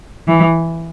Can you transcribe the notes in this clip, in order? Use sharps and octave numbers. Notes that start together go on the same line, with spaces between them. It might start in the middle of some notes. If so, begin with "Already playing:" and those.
E3